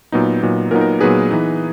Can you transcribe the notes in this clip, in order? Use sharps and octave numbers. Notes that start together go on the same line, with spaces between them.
A#2 F#3 B3 D#4
A#2 F#3 B3 D#4
A#2 F#3 B3 D#4 A#4
A#4
A#2 F#3 B3 D#4 G#4 B4
E3 B3 D#4